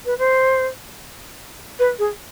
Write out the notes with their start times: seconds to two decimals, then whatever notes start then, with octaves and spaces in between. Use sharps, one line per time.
0.06 B4
0.18 C5
1.79 B4
1.99 G#4